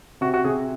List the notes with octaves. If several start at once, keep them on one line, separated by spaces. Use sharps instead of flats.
C3 F#4
F#4
C3 G#4